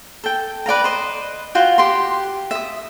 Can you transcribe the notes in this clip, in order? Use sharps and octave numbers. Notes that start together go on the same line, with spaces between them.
A4 G5
B4 D5 F5 A#5
C5 D#5
F4 F#4 G5
G4 C6
E5 D#6